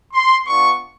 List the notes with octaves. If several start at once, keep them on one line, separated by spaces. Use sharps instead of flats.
C6
B3 D4 F4 C#6